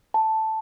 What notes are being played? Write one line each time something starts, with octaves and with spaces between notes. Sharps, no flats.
A5